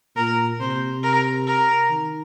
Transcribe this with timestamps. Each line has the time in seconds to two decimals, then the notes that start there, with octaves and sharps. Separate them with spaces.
0.16 A#2 A#4
0.60 C3 C5
1.03 A#4
1.47 A#4
1.90 D#3